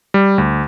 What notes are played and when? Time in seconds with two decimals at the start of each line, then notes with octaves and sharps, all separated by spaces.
0.14 G3
0.38 D2